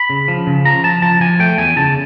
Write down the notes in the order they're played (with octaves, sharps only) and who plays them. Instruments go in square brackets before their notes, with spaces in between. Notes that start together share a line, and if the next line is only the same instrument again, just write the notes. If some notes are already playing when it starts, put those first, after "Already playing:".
Already playing: [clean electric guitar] B5
C#3
F3
C#3
F3 A#5
F3 A5
F3 A5
F3 G#5
A3 G5
E2 G#5
C#3 A5